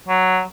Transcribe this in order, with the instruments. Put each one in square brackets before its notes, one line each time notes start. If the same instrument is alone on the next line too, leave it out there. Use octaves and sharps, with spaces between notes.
[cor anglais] F#3